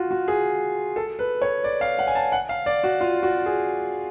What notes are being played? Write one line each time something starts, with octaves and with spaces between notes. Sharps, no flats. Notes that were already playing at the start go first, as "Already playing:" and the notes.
Already playing: F4 F#4
F#4
G#4
A4
B4
C#5
D5
F5
F#5
G#5
A5
F#5
F5
D5
F#4
F4
F#4
G#4